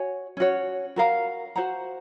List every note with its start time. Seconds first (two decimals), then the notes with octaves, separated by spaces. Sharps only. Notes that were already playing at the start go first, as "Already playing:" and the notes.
Already playing: F#4 C#5 G#5
0.37 C#4 F#4 C#5
0.96 F#4 A#4 F5 A#5
1.56 F#4 C5 F#5 A#5